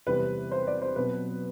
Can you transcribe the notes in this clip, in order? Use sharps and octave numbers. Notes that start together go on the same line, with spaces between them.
E2 C3 G3 C4 B4
C5
D5
C5
B2 F#3 C4 B4